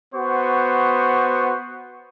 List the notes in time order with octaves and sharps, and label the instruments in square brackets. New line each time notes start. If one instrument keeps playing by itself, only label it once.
[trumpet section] B3 F#4 C5 C#6